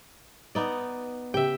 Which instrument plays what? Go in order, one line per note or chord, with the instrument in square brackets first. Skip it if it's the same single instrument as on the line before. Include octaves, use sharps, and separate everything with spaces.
[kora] B3 D#4 D5
[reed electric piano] C#3 G4 [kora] E5 G5